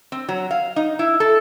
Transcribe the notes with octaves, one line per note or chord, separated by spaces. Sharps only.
C4
F#3
F5
D#4
E4
A4